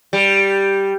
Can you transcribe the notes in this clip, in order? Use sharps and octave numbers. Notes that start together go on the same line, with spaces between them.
G3